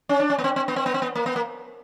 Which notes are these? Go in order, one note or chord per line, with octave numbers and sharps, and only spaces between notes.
C#4
D4
C#4
B3
C4
C4
B3
C4
B3
C4
B3
A#3
B3
A#3